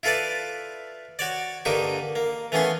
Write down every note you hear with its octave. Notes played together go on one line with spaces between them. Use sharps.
E4 F4 A4 B4 D5
F#4 C#5 D5
G2 D3 A#3 D#4 G4 C#6
A#3
E3 A3 B3 C#4 C6 C#6